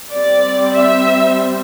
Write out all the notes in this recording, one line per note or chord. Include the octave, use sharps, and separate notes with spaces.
G3 C4 D5
E5